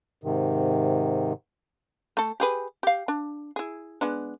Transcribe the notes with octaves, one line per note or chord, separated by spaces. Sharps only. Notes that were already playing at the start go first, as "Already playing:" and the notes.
G#2 C3 D#3
A3 A4
G4 G#4 B4
G4 F5
D4
E4 G#4
G#3 B3 D4